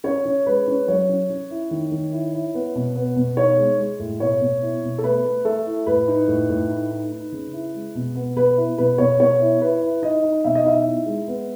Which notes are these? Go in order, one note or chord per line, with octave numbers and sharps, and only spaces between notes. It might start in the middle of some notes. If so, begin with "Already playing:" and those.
C#4 C#5
C#4
G#3 B4
C#4
F#3 C#5
C#4
C#4
E4
D#3
D#3
E4
E4
B3
B2
B3
B2
D#4 C#5
G#3
G#3
A2
B2 C#5
B2
E4
B2
A4
A3 B4
A3
A3 A4
E4
A2 B4
D#4
A2
A2
D#4
D#4
D#4
C#3
E4
G#3
B2
B3
B2 B4
E4
B2 B4
B2 C#5
B2 C#5
E4
E4 B4
E4
D#4 D#5
D#4
B2 E5
D#5
D#4 E5
E4
G#3
B3